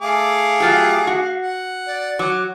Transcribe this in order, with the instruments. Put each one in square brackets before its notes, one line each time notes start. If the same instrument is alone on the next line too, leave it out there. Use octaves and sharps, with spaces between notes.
[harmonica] A3 G#4 D6 [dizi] F5
[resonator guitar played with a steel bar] F#3 F4 G4
F#4
[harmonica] F#5
[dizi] D5
[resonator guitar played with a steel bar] F#3 [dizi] D6